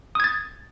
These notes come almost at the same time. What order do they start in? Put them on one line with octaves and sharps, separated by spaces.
D#6 G#6 A6